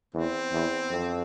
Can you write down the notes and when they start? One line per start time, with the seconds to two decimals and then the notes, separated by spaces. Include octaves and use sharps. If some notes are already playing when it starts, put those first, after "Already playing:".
0.14 E2 C4
0.52 E2
0.90 F2